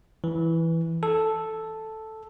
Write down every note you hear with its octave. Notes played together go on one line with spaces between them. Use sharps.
E3
A4